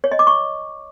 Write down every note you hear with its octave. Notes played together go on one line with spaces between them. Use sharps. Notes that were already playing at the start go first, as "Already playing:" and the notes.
C#5
D#5
D6
C#6